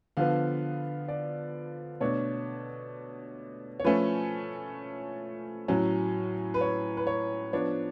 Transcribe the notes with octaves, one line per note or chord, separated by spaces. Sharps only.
D3 F3 B3 F5
D5
B2 A3 D4 C#5
C#5
F3 A3 C#4 B4
A2 F#3 C#4
B4
C#5
B4
C#5
F3 B3 D4 C#5